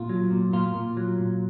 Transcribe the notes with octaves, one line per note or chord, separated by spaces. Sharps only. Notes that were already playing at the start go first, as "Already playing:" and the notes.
Already playing: A#2 F4
F#3
A#2
A#2 F4
A#2
F#3
A#2